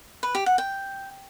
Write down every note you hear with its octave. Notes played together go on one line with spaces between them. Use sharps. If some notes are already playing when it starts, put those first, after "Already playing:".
B4
G4
F#5
G5